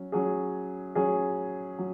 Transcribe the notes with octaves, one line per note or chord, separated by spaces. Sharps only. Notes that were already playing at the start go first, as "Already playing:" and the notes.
Already playing: F#3 C#4
F#3 C#4 G#4
F#3 C#4 G#4
F#3